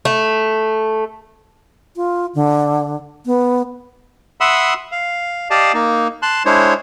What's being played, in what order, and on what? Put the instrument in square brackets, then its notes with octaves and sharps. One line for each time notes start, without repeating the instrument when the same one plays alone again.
[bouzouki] A3
[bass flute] F4
D3
B3
[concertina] E5 F#5 B5 C6 D#6 E6
F5
G4 D5 D#5 F5 A5
A#3 D#4
A5 C6 F#6
G#3 D4 E4 C5 C#5